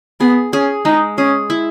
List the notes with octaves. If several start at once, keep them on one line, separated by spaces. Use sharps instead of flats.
B3 G#4
C#4 G#4
G#3 D#4
C#4 G#4
E4